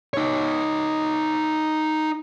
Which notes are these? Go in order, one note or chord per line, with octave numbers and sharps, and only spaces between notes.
D#4 C#5